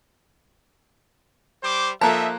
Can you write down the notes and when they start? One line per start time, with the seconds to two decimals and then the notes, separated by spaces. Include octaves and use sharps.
1.62 G3 C5 D6
2.01 F3 A#3 D#4 A4 E5 A5 A#5 F#6